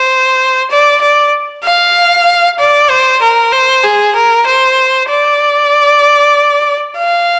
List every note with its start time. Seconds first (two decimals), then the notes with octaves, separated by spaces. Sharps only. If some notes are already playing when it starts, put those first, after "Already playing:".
Already playing: C5
0.70 D5
1.01 D5
1.64 F5
2.59 D5
2.90 C5
3.22 A#4
3.52 C5
3.83 G#4
4.15 A#4
4.46 C5
5.09 D5
6.98 F5